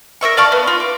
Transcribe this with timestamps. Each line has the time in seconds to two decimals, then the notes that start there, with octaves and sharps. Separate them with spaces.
0.21 A#4 D5 E5 C#6
0.37 D5 F5 A5 C#6
0.52 B3
0.67 F4
0.80 D6